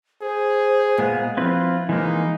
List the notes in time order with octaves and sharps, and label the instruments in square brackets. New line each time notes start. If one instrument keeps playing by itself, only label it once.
[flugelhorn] G#4 [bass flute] C5
[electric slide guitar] A#2 G#3 B3 [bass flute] F5
[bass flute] F3 [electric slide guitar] C4 E4 B4 [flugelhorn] F4
[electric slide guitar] E3 G#3 A#3 [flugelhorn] D#4